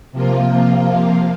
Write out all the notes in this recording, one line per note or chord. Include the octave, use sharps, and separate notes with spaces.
C3 F3 A#3 F4